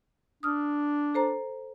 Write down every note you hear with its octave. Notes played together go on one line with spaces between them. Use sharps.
D4 D#6 F6
A4 C5 A#5